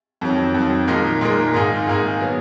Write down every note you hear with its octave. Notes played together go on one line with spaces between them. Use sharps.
F2 D#3 F#3
F2 D#3 F#3
A#2 G#3 D#4 A#4
A#2 G#3 D#4 A#4
G#2 D#3 A#3 D#4 G#4
G#2 D#3 A#3 D#4 G#4
F#3 B3